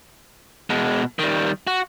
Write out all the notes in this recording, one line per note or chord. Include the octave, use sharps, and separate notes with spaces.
B2 G#3
D#3 G3
F#4